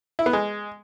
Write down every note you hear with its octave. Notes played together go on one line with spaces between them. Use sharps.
E4
B3
G#3